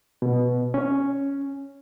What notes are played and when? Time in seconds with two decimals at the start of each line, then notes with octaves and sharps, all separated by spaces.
0.22 B2
0.74 C#4